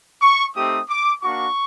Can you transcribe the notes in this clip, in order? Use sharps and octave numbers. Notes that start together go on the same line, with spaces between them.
C#6
A3 C4 D#4 G4 D#6
D6
A#3 D4 F#4 C#6